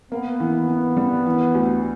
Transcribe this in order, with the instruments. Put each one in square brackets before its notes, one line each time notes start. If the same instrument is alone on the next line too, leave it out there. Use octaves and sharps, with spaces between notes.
[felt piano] A#3 [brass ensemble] B3
[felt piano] E3
E3
G3
E3
D2